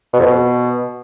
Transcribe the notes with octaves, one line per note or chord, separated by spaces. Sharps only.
B2
F2
B2